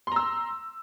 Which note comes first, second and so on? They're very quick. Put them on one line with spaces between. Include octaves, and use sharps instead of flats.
C6 A#5 E6